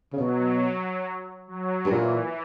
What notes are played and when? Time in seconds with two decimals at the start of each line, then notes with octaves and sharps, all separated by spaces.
0.13 C#3
0.18 B2 F#3
1.48 F#3
1.86 G2
1.91 A#2 E3